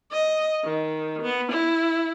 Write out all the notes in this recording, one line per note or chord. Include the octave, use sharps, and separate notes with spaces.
D#5
D#3
B3
E4